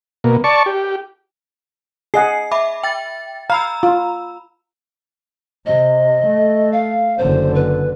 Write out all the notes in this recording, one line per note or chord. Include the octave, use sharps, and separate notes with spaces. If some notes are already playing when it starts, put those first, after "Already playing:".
B2 A#3
D5 A5 C#6
G4
G#4 D#5 F#5 C7
E5 B5 D6
G5 A6
F5 A#5 B5 E6
F4
C3 D#5
A3
F5
F#1 D3 C5
B4